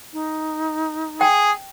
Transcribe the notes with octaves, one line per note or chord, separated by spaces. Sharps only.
D#4
G#4 G5